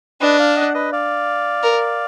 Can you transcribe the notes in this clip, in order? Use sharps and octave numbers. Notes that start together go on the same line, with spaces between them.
D4 B4 D#5
D5 F5
D#5 F#5
B4 D#5
D5 F5
A#4